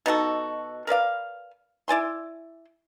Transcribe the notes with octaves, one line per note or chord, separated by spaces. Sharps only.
B2 D#4 F#4 A4
A#4 B4 D5 F5
E4 D5 G#5 C6